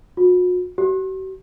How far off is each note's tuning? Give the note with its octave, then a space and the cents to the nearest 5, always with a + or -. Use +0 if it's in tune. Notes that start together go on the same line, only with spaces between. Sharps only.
F#4 -40
F#4 +45